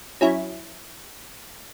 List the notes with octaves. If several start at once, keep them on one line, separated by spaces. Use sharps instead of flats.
F#3 C#4 E4